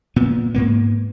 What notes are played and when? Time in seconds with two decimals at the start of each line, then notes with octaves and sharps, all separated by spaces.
0.16 A#2 B3
0.54 G#2 A#3 B3